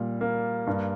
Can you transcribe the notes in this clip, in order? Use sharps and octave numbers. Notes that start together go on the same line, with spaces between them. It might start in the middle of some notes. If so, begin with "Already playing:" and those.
Already playing: A#2 G3
A#3
G2